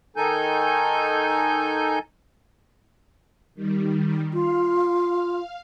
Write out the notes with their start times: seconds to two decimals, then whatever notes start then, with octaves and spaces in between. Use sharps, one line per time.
0.16 D#3 D#4 A4 G#5 G6
3.55 D#3 G3
4.34 F4 F5